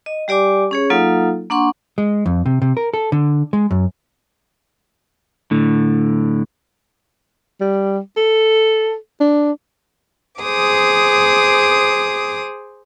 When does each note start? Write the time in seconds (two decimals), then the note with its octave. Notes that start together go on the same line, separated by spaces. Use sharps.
0.06 D#5
0.28 G3 G4 D5 G#5 D6
0.71 C#4 G#4 C#5
0.90 F#3 A#3 D#4 F4 A4 F5
1.50 A#3 D4 F#5 C6 C#6
1.98 G#3
2.26 F2
2.46 C3
2.62 C3
2.77 A#4
2.94 A4
3.12 D3
3.53 G#3
3.71 F#2
5.51 A2 D3
7.61 G3
8.17 A4
9.20 D4
10.42 G#4 C5 D6 D#6